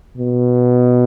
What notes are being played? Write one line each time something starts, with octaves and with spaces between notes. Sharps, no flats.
B2